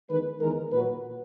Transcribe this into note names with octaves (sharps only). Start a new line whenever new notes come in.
E2 D#3 G#3 B4
E2 D#3 G#3 A#4
A#2 F#3 B4